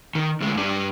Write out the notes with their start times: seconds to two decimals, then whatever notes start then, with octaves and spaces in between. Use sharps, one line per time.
0.15 D#3
0.40 D2 G#3
0.56 G2 D4